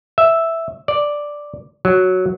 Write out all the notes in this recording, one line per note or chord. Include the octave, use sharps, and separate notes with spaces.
E5
D5
F#3